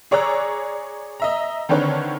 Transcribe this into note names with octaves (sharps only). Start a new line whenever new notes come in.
G#4 C#5 D5 A#5 E6 F#6
D#5 E5 A#5
D3 D#3 C4 D4 B4 C#5